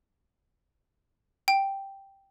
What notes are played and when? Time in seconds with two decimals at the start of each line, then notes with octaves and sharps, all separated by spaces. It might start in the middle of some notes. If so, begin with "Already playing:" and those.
1.48 G5